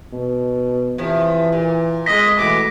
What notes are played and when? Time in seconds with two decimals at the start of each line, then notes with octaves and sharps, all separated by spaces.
0.13 B2
0.98 C3 E3 F3
1.52 A#2
2.06 G#3 D#5 A#6 B6
2.39 B2 E3 A3 B3 D6